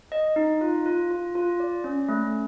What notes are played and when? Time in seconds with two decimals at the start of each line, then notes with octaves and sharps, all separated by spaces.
0.12 D#5
0.36 D#4
0.61 F4
0.86 F4
1.11 F4
1.35 F4
1.60 D5
1.84 C#4
2.09 A3